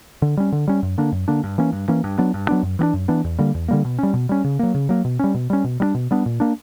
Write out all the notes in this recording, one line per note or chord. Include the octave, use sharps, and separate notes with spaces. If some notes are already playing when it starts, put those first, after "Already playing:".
D3
G3 C#4
D3
G3 C#4
F#2
D3 A#3 D4
F#2
D3 A#3 D4
G2
E3 A#3 C#4
G2
E3 A#3 C#4
G2
F#3 B3 D4
G2
F#3 B3 D4
F#2
E3 B3 D4
F#2
E3 B3 D4
E2
D3 G3 A#3
E2
D3 G3 A#3
B2
G3 C#4
B2
G3 C#4
C#3
F#3 A#3
C#3
F#3 A#3
B2
G3 C#4
B2
G3 C#4
B2
G3 B3 D4
B2
G3 B3 D4
A#2
A#3 D4